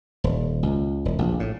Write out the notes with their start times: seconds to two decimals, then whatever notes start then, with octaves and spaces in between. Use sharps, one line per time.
0.24 D#1
0.63 C#2
1.05 E1
1.19 A#1
1.40 A2